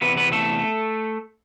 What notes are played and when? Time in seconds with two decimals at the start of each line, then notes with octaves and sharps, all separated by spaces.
0.01 E2 C3 E3 B3 B4
0.17 B3 B4
0.32 A3 A4